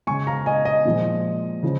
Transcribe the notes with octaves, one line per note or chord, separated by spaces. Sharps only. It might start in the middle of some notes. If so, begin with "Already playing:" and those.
C#3 G#3 G#5 C#6
F5 A#5
D#5 G#5
D#5
A#2 F3 G#3
C#3 F3